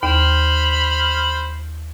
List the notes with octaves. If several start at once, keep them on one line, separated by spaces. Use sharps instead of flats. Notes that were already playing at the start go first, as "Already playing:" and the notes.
D#2 C5 B5 F6